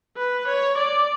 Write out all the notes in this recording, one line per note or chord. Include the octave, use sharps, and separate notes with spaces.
B4
C#5
D5